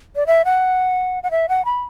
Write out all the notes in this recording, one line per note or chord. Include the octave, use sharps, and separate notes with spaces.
D5
E5
F#5
F#5
E5
F#5
B5